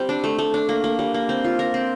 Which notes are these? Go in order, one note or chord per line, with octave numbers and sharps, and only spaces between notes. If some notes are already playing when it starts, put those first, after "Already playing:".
Already playing: G3 C4
D4
A3
A3
D4
A#3
A#3
G3
A#3
C4
F4
A#4
C4